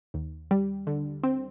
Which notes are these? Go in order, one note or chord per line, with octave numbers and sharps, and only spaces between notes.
D#2
G3
D3
C4